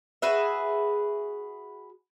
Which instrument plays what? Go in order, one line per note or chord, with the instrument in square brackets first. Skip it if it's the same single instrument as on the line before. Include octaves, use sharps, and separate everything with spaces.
[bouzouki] F#4 G#4 B4 E5